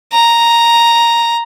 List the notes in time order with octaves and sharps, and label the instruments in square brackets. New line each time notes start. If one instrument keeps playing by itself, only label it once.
[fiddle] A#5